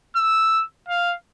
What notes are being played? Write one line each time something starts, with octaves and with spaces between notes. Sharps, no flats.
E6
F5